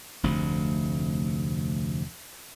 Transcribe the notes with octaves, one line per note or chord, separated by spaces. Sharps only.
F1 D2 C3